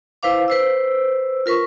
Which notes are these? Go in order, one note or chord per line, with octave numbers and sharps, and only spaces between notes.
E4 B4 C5 F5 D6
B4 C5 E6
F4 A#4 B4 C#6